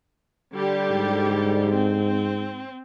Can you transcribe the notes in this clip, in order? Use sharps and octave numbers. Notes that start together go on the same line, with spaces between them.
D3 G3 G4
G#2
C4